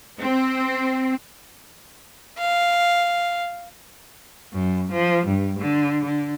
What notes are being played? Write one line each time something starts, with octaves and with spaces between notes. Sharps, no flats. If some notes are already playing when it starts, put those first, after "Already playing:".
C4
F5
F#2
F3
G2
D3
D3